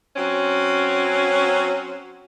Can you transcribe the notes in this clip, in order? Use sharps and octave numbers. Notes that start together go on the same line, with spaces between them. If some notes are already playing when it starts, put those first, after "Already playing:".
F#3 C4 C#4